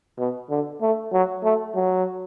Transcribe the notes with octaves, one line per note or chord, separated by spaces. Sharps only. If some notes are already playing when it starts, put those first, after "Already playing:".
B2
D3
A3
F#3
A3
F#3